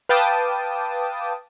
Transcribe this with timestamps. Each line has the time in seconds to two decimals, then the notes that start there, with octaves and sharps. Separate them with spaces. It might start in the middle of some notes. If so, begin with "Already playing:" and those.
0.09 B4 F5 G5 A5 D6 D#6